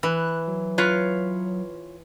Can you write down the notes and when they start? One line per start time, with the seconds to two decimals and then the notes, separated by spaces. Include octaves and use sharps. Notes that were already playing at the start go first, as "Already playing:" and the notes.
0.03 E3 F#6
0.47 F#3
0.78 F4 B4 C#5